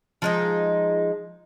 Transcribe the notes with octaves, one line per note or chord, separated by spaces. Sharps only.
F3 G#3 D#4